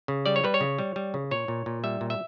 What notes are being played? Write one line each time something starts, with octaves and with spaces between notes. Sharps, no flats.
C#3
G3 D5
C#5
G3 B4
C#5
C#3
G3
G3
C#3
A#2 C#5
A#2
A#2
G3 E5
A#2
E5